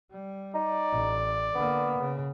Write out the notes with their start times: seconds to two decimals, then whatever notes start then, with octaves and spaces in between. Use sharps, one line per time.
0.11 G3
0.54 D#4 D5
0.91 A1
1.55 D3 A#3 B3
1.98 C#3